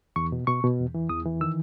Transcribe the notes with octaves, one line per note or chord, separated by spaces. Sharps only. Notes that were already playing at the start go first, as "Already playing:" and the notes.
E2 C#6
B2
B2 C#6
B2
E2
E3
E2 D#6
E3
D#3 E6